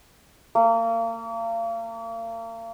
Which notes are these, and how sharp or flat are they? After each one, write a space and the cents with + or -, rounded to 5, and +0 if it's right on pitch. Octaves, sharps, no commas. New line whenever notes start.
A#3 -35